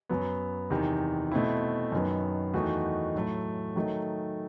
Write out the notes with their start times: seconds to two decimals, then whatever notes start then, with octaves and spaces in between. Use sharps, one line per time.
0.09 F#2 F#3 B3
0.70 E2 C3 D#3
1.32 B2 A3 C4 E4
1.92 F#2 D#3 F#3 B3
2.54 E2 D#3 A3 D#4 F#4
3.15 A2 F#3 A3
3.76 D#3 F#3 A3 D#4